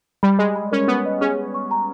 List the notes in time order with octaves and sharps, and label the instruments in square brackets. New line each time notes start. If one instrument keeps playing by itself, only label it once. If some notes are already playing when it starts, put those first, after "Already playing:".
[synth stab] G3 [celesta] B5
[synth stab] G#3 [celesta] D#5
[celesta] B5
[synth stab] C#4 [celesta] A#4
[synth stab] B3 [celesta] B4
[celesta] D#5
[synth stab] C#4 [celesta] G#4
[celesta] G#4
C#6
A#5